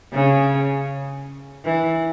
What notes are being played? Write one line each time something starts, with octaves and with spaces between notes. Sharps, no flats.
C#3
E3